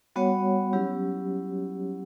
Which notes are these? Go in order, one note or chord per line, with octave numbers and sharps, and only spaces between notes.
G3 B3 F#4 C#5 F#5
F#3 C#4 E4 G4